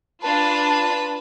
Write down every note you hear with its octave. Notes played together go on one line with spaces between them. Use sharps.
D4 F4 B4 A5